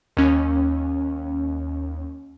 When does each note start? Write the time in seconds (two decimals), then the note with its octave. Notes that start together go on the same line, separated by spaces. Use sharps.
0.17 D#2 C#4